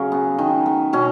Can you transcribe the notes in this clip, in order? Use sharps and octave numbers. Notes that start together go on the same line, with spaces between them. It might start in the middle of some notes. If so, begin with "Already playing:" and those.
Already playing: C#3 F#3 A#4
B3
D#3
B3
B2 C#4